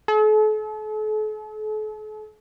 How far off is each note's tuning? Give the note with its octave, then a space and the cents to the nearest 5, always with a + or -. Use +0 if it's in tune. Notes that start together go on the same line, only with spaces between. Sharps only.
A4 -45